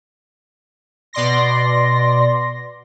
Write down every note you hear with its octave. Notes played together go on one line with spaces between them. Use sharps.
B2 D5 C6 A#6